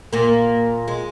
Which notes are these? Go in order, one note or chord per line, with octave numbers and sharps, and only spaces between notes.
A#2 A#3
G#3